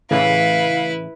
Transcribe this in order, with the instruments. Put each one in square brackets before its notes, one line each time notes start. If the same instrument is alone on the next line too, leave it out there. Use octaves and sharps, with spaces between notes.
[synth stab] A2 C#3 E3 [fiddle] E4 B4 [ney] F5